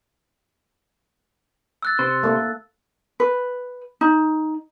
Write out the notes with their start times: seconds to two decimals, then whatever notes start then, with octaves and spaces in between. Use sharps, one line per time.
1.82 E6 F#6 A6
1.99 C3 C5
2.23 A3 A#3
3.20 B4
4.01 D#4